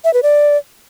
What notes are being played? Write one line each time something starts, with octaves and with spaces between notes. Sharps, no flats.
E5
B4
D5